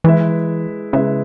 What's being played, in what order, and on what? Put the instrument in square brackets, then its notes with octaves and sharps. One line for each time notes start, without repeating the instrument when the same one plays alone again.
[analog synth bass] E3 [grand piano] G#3 E4 B4 E5
[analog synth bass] C#3 [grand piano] G#3 E4 B4 E5